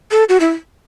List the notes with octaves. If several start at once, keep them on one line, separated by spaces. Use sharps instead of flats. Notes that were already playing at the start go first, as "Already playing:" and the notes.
A4
F#4
E4